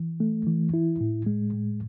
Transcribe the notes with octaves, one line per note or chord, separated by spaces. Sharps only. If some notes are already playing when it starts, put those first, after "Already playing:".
Already playing: E3
A3
E3
E4
A2
G#3
A2